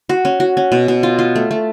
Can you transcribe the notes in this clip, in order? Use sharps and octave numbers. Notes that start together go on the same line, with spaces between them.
F#4
C#4
F#4
C#4
B2
B2
F4
F4
A3
A3